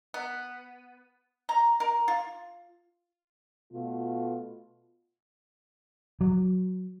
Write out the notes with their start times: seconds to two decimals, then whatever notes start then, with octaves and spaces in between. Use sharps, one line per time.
0.14 B3
1.49 A#5
1.80 A#4
2.08 F4
3.72 B2 A3 F4
6.21 F#3